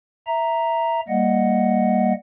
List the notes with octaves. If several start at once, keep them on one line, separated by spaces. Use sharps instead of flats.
E5 A#5
G3 A#3 D#5 F#5